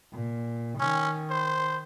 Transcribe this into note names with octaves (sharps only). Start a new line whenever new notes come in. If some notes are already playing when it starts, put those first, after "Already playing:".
A#2
D#3 C#4
C5